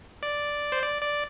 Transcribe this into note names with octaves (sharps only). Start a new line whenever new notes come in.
D5
C5
D5
D5